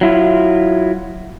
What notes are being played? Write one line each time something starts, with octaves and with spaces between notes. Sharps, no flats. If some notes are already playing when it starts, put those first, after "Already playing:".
F#3 E4 F4